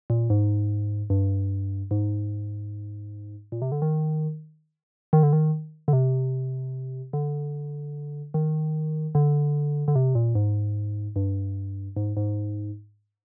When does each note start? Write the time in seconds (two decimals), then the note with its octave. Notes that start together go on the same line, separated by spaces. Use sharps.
0.10 A#2
0.30 G#2
1.10 G2
1.91 G#2
3.52 A#2
3.62 C3
3.72 D3
3.82 D#3
5.13 D#3
5.23 D3
5.33 D#3
5.88 D3
5.93 C3
7.13 D3
8.34 D#3
9.15 D3
9.88 D3
9.95 C3
10.15 A#2
10.35 G#2
11.16 G2
11.96 G#2
12.17 G#2